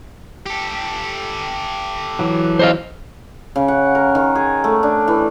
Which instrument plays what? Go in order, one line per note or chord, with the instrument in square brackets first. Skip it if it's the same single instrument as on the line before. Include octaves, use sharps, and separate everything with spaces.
[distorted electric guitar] G4 A4
[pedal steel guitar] E3 F#3
[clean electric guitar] C5 D#5 F5
[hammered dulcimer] C#3
F#5
A#4
D#3
G#4
A3
D4
E3